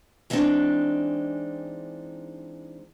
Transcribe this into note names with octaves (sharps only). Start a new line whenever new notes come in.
E3 G3 G#3 C4 D4 D#4